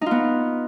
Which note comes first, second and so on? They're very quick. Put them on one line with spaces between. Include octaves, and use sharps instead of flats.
D#4 F4 B3